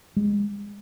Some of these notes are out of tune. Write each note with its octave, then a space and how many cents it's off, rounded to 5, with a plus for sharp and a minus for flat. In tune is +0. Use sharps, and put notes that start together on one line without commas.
G#3 -20